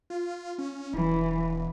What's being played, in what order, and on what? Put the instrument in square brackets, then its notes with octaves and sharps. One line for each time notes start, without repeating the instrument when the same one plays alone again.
[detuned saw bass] F4
C#4
[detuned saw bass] E1 [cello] E3